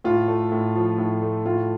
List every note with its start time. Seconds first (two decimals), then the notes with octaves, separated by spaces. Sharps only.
0.04 A2 F4
0.28 A3
0.52 A2
0.75 F3
0.98 A2
1.22 A3
1.46 A2 F4